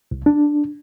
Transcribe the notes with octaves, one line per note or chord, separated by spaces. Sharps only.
C2
D4